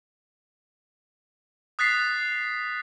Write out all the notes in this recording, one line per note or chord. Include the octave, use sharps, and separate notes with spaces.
D#6 F#6 A6 B6 C7